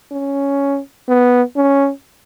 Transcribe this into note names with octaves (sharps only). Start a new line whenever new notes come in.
C#4
B3
C#4